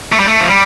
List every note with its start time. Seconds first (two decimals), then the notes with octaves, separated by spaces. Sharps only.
0.12 A3
0.20 G3
0.28 A3
0.41 F3
0.49 G3